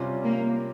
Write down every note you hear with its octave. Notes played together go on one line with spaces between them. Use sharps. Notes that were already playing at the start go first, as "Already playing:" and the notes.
Already playing: C3 G3 C#4 F4
A#3